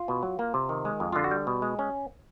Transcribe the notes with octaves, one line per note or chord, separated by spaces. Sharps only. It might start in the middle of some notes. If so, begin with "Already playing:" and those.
Already playing: F4
B2
F#3
A#3
C3
D#3
G#3
F2
D3 F4
F#4
G3
B2
G#3
C#4